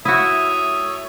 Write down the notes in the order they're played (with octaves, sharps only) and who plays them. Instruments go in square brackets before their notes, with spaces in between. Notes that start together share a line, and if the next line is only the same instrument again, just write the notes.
[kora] E4 F#4 [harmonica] C#5 E5 [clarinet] D#6